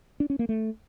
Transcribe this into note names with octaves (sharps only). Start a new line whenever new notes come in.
D4
C#4
A#3
A3